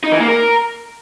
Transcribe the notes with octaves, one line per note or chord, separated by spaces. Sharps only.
D#4
E3
A#3
A#4